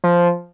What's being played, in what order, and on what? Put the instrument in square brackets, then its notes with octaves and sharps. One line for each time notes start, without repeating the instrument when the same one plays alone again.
[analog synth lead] F3